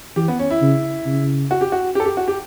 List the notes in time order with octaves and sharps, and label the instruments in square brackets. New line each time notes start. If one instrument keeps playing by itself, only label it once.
[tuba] E3 [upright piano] G4
[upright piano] B3
C#4
E4
[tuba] C#3
C#3
[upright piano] F#4
G4
F#4
G4
A4
G4
F#4
G4